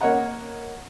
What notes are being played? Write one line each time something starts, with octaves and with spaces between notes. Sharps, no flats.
A#3 C#5 D#5 F#5 A#5